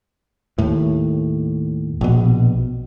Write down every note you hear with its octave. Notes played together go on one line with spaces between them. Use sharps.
D#2 A2
A#1 B2